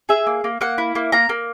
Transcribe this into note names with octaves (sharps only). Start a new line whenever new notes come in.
G#4 E5
A#3
A#3
A#3 F#5
E4
A#3
A#3 A#5
A#3